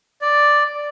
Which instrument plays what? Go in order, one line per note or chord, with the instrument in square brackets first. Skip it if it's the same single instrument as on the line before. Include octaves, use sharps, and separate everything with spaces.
[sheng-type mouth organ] D5